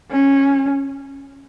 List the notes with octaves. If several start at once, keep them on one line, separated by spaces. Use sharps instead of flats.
C#4